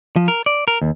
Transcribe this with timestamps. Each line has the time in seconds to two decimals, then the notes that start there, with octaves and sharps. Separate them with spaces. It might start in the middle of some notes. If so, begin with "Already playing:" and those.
0.16 F3
0.28 A#4
0.46 D5
0.68 A#4
0.82 D#2